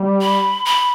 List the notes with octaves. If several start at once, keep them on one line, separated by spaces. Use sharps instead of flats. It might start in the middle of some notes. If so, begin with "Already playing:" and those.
Already playing: G3
B5
B5